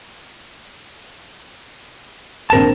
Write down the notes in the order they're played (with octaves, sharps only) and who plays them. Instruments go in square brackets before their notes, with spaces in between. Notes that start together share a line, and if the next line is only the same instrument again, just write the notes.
[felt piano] A#1 C4 E7 [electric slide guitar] A#4 A5